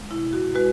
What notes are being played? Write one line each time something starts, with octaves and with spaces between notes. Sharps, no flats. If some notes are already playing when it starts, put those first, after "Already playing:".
Already playing: G#3
B2 E4
F#4
G#3 F#4 B4